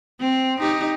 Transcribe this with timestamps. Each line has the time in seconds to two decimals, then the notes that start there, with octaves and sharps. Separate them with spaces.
0.20 C4
0.60 D#4 G4